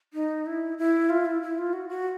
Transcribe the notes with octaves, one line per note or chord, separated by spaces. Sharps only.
D#4
E4
E4
F4
E4
E4
F4
F#4
F#4